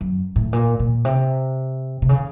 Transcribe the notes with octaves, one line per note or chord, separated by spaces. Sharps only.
F#2
A2
A#2
A#2
C3
C3
C#3